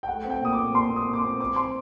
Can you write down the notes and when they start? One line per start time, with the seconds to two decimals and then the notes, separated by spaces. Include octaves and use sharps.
0.03 G5
0.08 A3 F#5
0.25 C4
0.30 G5
0.41 A#2 D#6
0.53 D6
0.58 C4
0.74 A#2 C6
0.90 C4
0.96 D#6
1.07 A#2
1.13 D6
1.18 C6
1.24 C4
1.40 C4 D6
1.56 C4 C6